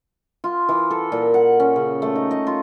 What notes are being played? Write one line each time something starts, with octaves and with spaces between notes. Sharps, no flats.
F4
E3
A4
A#2
F#5
C#4
C#3
A3
D#4
D#5
F4